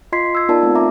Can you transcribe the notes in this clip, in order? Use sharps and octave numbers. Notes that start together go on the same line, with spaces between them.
F4 D#5 C6 G#6 B6 C7
E6 G#6
B3 D#4 F4 A#4 D5 A5
A3 C4
E5 A#5 D6